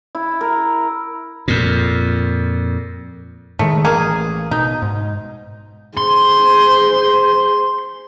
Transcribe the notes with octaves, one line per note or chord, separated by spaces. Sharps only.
E4
A#4
F2 A#2
A2 D#3 G#3 A3
A1 A#3 G#4
B2 D#4
G#2
G#4 C5 C6